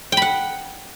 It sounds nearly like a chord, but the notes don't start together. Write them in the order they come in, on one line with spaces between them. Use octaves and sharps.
G5 B5 F#5